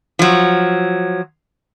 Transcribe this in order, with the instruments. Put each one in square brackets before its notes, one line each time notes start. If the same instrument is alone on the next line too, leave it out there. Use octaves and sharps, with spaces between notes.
[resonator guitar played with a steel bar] F3 F#3